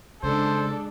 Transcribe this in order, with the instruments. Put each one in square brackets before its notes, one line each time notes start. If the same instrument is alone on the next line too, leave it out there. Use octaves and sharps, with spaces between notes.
[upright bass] C#3 [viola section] G#3 D4 [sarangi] A4 [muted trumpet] C5